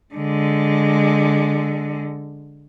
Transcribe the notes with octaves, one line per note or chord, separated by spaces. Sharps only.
D3 G#3